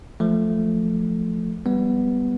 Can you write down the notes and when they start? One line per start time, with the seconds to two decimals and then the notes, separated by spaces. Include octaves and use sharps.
0.20 F3 A3
1.66 G3 B3